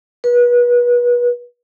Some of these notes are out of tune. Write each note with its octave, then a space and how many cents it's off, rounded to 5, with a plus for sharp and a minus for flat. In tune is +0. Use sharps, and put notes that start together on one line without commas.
B4 -30